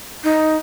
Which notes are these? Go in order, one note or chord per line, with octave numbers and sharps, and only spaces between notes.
D#4